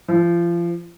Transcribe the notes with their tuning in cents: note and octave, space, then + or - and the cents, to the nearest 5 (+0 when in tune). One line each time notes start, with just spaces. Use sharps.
F3 -30